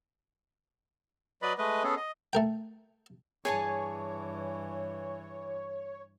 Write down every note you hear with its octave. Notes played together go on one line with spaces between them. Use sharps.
F#3 B4 D5 D#5 B5
G#3 A3 B4 D#5
B3 C#4 G#4 A4
D#5
A3 A#4 G5
G2 E3 G#4 C#5 G#5 A5